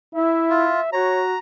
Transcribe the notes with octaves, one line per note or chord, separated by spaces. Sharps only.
E4 E5
F4
F#4 C#5 A#5